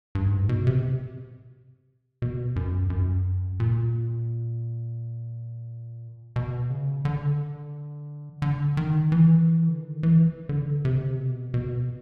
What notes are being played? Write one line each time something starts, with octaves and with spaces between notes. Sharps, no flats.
G2
G#2
B2
C3
B2
F#2
F#2
A#2
B2
C#3
D3
D3
D#3
E3
D3
D#3
E3
D3
C3
B2
B2